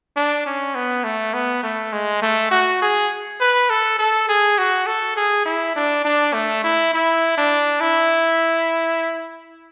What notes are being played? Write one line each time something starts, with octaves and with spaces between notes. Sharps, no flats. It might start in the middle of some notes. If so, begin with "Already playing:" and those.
D4
C#4
B3
A3
B3
A3
G#3
A3
F#4
G#4
B4
A4
A4
G#4
F#4
A4
G#4
E4
D4
D4
A3
E4
E4
D4
E4